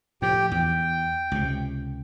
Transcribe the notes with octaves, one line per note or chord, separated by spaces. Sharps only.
A2 F3 G4 G5
E2 G5
C#2 C3